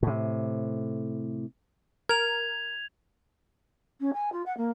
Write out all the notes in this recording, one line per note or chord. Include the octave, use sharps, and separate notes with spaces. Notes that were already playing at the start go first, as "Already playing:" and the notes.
A2 C3
A#4 G#6 F7
C#4
G#5
F4
F#5
A#3